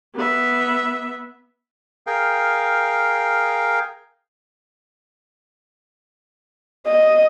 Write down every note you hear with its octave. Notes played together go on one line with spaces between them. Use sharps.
B3 E5
G#4 A#4 F5 G5
D#5